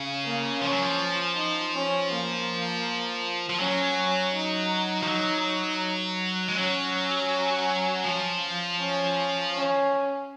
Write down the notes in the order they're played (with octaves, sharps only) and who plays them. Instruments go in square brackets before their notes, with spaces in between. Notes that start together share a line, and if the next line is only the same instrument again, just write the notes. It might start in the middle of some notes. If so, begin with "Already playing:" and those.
Already playing: [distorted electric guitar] C#3
[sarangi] A#3
[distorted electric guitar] F3 [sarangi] C#4
[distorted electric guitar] F#3
F3
[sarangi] D#4
C#4
A#3
[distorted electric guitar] F3
[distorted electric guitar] F#3 [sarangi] C#4
[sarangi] D#4
[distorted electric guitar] F3
F#3
G#3
[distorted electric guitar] F#3 [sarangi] C#4
[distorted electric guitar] F3
[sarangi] C#4
C#4